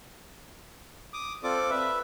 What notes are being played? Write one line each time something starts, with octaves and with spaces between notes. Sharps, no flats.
D6 D#6
C4 F4 A4 D5 D6
B4 E5